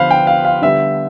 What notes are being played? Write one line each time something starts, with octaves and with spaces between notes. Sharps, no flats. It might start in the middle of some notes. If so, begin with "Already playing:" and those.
Already playing: D3 F3 B3 B4 C5 F5
G5
F5
F5
D3 G3 B3 E5